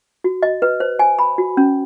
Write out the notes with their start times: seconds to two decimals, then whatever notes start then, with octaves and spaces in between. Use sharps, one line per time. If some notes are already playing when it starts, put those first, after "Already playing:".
0.24 F#4
0.43 D#5
0.62 B4
0.80 C5
0.99 G#5
1.19 B5
1.38 F#4
1.57 C#4